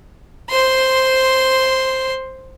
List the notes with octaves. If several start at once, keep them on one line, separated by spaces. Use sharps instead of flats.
C5 C6